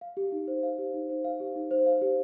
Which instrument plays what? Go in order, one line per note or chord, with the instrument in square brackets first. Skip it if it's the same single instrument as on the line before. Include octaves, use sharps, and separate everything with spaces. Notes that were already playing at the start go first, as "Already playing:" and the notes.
[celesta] F5
G4
D#4
C5
F5
G4
D#4
C5
F5
G4
D#4
C5
F5
G4